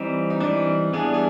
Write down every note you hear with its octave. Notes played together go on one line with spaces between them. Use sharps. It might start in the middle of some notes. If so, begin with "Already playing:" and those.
Already playing: E3 G3 C4 D#4
D#4
E3 G3 C4 D4
E3 G3 B3 D4 G#4
G#4